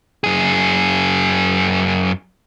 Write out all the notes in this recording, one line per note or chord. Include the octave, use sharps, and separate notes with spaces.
F#2 G#4